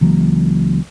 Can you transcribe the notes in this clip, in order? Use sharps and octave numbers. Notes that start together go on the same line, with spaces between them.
C#2 E3 F#3 A#3